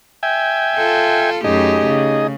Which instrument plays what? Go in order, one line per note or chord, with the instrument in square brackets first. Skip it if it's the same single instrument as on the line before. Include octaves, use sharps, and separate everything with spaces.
[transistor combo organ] E5 G5 G#5
[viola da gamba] F4 A4
[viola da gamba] F#2 A3 G4 [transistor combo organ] D#4 G#4 D#5
[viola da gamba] C#3